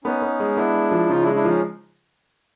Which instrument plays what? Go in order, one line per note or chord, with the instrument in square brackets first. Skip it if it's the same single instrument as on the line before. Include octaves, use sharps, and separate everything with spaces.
[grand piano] B3 [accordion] C#4 D#4
[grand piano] B3
G#3
[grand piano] B3 [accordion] D4 E4
[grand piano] G#3
F3
[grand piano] C#3 [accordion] D#4 F4
[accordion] D4 E4
[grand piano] G#3
[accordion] D4 E4
[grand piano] F3 [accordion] C#4 D#4